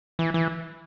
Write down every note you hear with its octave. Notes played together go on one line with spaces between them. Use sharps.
E3
E3